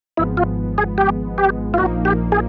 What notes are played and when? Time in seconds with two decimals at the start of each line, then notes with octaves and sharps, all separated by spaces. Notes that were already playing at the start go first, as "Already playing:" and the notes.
0.17 G#1 G#2 F3 G#3 B3 E4
0.37 F4
0.78 G#4
0.98 G4
1.38 G4
1.74 F4
1.78 A#1 A#2 F3 A#3 D#4 F#4
2.05 G4
2.32 G#4